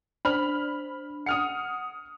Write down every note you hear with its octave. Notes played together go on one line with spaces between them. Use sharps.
D4 C5 B5 F6
F#5 D#6 F6 C#7